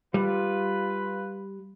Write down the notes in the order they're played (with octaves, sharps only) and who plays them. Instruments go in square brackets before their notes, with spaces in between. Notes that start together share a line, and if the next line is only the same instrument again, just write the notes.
[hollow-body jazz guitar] G3 [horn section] F4 B4